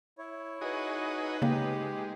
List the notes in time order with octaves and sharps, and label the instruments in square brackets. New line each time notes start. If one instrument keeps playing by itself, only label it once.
[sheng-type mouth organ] E4 C#5
[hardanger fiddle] D#4 B4 [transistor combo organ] F#4 G#4 D#5
[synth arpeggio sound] C#3 A#3 [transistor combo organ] G#3 [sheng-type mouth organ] G4